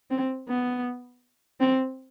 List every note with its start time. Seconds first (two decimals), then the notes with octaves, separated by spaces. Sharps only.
0.10 C4
0.48 B3
1.60 C4